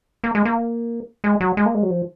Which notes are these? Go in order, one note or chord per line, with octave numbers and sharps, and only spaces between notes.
A#3
G#3
A#3
G#3
F#3
G#3
A#3
G#3
F#3
F3